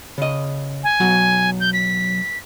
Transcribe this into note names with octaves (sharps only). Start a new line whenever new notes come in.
C#3 D#5
G#5
B1 F#3 F#4
G6
B6